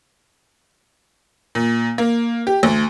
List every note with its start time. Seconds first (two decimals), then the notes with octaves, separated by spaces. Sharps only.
1.55 A#2
1.98 A#3
2.47 G4
2.63 D2